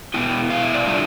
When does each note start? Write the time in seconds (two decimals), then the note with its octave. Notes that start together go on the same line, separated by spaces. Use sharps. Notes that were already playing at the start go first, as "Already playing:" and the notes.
0.14 B2 B3 E4 G5
0.50 F5
0.63 E5
0.74 D5
0.86 D3 G3 D4 F4 E5